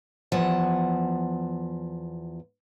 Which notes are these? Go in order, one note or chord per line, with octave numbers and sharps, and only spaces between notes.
E2 F3 F#5